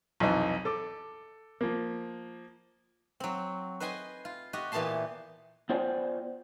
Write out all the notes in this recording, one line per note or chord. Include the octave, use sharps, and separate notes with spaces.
B1 F2 C3 E3 D#4
A4 D6
F3 A#3
F#3 C4
B4 C5 D#5 G5 G#5 C6
F4
F#4 G4 D#5
A#2 E3 B3 G4 A5 C6
B3 F4 C5 D5 G5 G#5